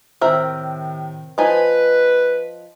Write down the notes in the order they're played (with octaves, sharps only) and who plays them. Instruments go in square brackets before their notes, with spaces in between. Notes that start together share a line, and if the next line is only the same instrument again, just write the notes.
[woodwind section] A2 C3 D#3 [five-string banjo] C4 A#4 E5
[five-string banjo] F3 D#4 G#5 [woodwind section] B4